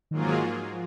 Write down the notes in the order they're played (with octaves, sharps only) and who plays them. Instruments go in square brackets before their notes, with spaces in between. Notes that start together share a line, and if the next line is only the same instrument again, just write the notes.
[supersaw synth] G#2 F#3 A#3 F4 G#4 [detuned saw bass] D#3
[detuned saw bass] D#3
F3